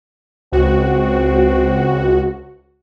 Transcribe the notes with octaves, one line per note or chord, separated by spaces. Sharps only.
C#2 C4 F#4